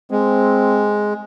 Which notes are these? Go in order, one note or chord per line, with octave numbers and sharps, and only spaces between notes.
G#3 C4